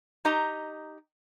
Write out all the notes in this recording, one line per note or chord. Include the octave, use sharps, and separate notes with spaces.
D#4 G4 D#5 A#5